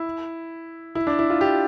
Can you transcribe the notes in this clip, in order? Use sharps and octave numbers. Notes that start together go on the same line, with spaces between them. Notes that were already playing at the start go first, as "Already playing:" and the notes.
Already playing: E4
E4
D4
E4
F4
G4